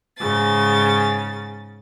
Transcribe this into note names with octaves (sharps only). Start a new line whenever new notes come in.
G#2 C#3 A6